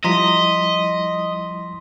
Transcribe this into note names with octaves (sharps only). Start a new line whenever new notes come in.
F3 G3 E4 D#5 A#5 C6 B6